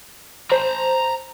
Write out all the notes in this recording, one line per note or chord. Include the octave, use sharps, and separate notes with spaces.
C5 A#5 B5